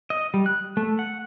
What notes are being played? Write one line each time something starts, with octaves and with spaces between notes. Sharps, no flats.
D#5
G3
F#6
A3
F#5